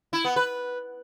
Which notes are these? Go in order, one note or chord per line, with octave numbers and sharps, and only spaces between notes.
E4
B3
B4